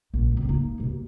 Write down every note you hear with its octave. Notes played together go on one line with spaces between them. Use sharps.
A#1
G#1 C#2
A#3 D#4
D#2 B2